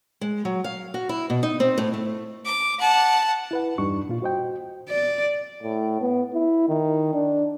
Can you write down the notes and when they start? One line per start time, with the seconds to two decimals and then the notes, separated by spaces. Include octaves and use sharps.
0.21 G#3
0.45 F#3
0.64 F5
0.94 F#4
1.09 E4
1.30 B2
1.43 D#4
1.60 C4
1.78 A2
1.94 A3
2.45 D6
2.79 F#5 A5
3.51 E4 B4 F#5
3.78 E2 G2 G3 D4 D#4 C#6
4.09 A#2 F4
4.22 F#4 C5 D#5 G5
4.89 D5
5.63 A2
6.01 B3
6.33 E4
6.69 D#3
7.14 D4